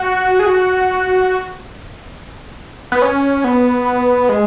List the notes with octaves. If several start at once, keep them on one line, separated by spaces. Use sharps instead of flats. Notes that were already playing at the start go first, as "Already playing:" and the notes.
Already playing: F#4
G#4
F#4
B3
C#4
B3
G#3